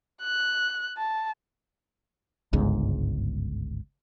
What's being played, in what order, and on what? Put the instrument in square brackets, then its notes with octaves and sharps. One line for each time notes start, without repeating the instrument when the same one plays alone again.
[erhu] F#6
A5
[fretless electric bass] G1 C#2 G#2